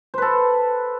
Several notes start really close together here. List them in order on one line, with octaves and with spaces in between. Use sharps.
C5 B4 A4